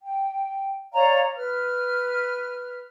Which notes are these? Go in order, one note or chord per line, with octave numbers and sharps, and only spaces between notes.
G5
C#5 D5 F5 A#5
B4 F6